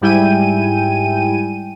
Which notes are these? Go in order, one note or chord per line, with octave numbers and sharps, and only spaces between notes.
G#2 G3 E4 G5 G#5 D#7